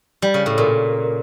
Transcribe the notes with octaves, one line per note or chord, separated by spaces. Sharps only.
G3
C#3
A2
A#2